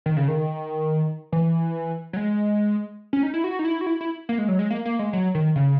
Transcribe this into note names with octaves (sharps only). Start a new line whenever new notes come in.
D#3
C#3
D#3
E3
F#3
G#3
C#4
D#4
E4
F#4
D#4
E4
F#4
E4
E4
A#3
G#3
F#3
G#3
A#3
A#3
G#3
F#3
D#3
C#3